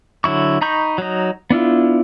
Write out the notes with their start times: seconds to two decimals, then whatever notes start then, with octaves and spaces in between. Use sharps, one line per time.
0.24 D3 F#3 E4 C#6
0.61 D#4 A#5 B5 C#6 G6
0.98 F#3 D#4
1.50 B3 D4 E4 F4